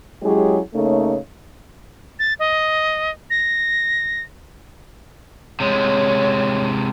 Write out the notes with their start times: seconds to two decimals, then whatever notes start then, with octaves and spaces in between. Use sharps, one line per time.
0.23 F#3 G#3 C#4 E4 G4 G#4
0.74 C#3 A3 A#3 D#4 A4 C#5
2.19 A6
2.39 D#5
3.30 A#6
5.60 C3 G#3 C#5